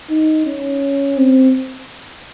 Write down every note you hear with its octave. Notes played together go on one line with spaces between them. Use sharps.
D#4
C#4
C4